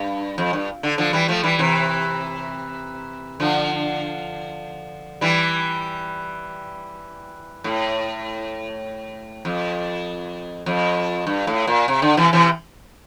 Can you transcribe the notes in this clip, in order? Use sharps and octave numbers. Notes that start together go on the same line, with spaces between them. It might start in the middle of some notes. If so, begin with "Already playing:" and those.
Already playing: G2
F2
G2
D3
D3 F3
E3 G3
F3 A3
E3 G3
C3 E3
D3 F3
E3 G3
A2
F2
F2
G2
A2
A#2
C3
D3
C3 E3
C3 E3